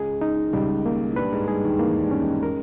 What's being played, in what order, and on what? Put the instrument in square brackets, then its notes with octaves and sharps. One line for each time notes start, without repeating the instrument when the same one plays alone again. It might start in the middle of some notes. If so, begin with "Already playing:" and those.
Already playing: [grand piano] C#2 C#3 [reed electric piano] G#4
[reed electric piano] D#4
[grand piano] D#3
[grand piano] C#2 C#3 [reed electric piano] G3
[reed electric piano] A#3
[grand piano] E3
[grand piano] G2 G3 [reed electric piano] B4
[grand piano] G#2 G#3
[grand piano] G2 G3 [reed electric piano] G#4
[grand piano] D#2 D#3
[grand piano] E2 E3 [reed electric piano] A#3
[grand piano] G2 G3
[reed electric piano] C#4
[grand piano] G#2 G#3
[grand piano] G#3 [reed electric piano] A#4